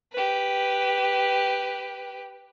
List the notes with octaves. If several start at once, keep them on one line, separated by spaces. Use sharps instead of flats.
G4 B4